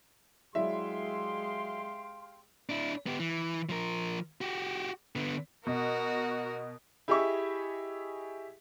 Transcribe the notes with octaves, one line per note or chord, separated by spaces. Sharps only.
F#3 G#3 E4 G4 D5 E5 F5 C6
D4 E4
B3 G4
E3
F3 A#4
F#4 G4
D3 B3
B2 F#4 A#4
E4 G4 G#4 D#5 E5 C#6